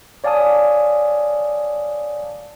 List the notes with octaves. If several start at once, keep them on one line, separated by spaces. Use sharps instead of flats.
C#5 D5 F5 G#5 A5 D#6